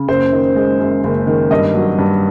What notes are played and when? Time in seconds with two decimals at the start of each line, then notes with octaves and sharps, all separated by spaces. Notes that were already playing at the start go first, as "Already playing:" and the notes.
Already playing: C#3
0.08 F#1 C5
0.32 D#3
0.56 G#3
0.79 F#2
1.04 F#1
1.27 D#3
1.51 G2 D#5
1.74 F#3
1.98 G2